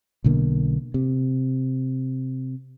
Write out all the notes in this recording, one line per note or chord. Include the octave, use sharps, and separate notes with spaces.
B1 B2 D3 A#3
C3